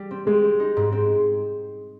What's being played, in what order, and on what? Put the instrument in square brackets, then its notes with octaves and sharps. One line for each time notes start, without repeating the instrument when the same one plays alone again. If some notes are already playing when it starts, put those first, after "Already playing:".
Already playing: [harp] G3
C4
[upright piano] G#3 [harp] C4
[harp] C4
D#4
G#2
C4